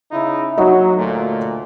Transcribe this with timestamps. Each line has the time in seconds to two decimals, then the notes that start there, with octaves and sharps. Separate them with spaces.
0.11 C#3 D#4 E4
0.58 F#3 D#4 F#4 D#5
0.95 D2 A#2 A3